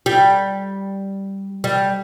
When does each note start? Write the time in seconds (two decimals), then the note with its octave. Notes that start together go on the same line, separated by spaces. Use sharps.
0.06 G3
1.64 G3